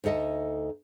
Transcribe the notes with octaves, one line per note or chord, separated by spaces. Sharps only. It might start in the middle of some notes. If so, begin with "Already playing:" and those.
D2 D#4 A4 D#5 E5